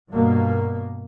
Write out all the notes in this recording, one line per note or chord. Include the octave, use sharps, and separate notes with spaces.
G2 B2 A#3